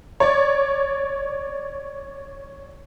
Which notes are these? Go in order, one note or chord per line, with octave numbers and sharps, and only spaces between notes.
C#5 D5